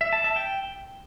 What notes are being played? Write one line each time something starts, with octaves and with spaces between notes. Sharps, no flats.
E5
A5
E5
G5